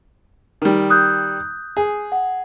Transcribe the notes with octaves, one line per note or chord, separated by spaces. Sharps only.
D#3 G3
D#6 F#6 G6
G#4
F#5